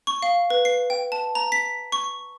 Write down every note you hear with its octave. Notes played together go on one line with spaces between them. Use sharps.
C#6
F5
B4
C7
G5
A5
A#5
B6
C#6